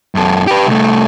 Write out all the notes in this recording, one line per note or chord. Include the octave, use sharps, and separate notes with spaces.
F#2 A4
G4 B4
C2 A3